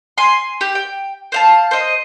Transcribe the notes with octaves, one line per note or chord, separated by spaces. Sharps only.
G#5 C6
G4
G5
C5 F5 A5
C5 D#5